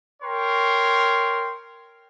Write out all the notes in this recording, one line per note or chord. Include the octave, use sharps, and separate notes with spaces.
A#4 C#5 G5 C6